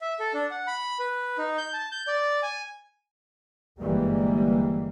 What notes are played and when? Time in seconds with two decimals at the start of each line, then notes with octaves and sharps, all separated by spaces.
0.01 E5
0.20 A4
0.34 D4
0.51 F#5
0.67 B5
0.99 B4
1.38 D#4
1.58 G6
1.73 A5
1.92 G6
2.07 D5
2.43 G#5
3.79 G1 E3 G3 G#3 A#3